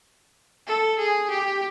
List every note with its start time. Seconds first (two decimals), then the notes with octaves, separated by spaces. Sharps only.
0.67 A4
0.99 G#4
1.30 G4